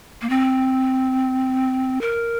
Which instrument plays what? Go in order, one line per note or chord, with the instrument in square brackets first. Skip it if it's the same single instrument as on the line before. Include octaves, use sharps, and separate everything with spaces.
[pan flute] A#3
C4
A#4